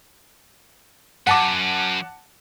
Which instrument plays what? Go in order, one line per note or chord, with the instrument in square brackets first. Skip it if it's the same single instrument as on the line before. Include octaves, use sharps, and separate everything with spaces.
[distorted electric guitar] F#2 [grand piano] F#5 A5 D6